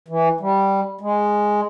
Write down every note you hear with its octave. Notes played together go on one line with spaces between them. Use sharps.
E3
G3
G#3